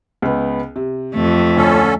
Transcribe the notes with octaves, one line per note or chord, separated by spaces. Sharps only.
C#2 B3
C3
F2 A3
D2 D3 C#4 A4